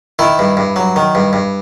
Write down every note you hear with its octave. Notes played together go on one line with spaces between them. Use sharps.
D#3 E4
G2
G2
F#3
D#3
G2
G2